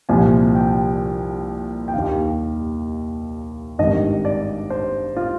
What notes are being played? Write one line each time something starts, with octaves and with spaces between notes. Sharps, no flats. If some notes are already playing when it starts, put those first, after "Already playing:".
C2 A#2 F3 G#5
G5
G5
D#2 D#3 F5
G#1 G2 D#3 D#5
D5
C5
F4